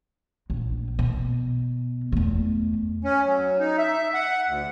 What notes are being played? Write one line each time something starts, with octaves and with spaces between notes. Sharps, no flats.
A#1
B2
E2 A3
C#4
F#3
D#4
E5
F#5
D2